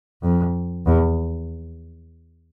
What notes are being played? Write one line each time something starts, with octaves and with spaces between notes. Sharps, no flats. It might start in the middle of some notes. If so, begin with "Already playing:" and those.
F2
E2